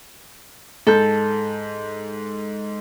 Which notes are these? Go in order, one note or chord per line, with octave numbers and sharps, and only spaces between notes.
G#2 A4 G6